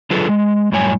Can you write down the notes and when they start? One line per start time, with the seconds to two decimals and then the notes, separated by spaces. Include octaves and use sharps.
0.10 D3 F#3 F4 G#4 A4 B4
0.29 G#3
0.72 F#2 A2 G3 C#5 G#5